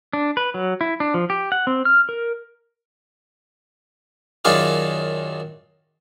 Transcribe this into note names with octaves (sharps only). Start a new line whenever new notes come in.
D4
B4
F#3
E4
D4
F3
G4
F#5
C4
F6
A#4
F#2 D#3 F4 G#4 D5 F5